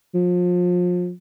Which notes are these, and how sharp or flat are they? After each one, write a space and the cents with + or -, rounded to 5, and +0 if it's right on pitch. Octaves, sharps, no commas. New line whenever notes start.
F3 +30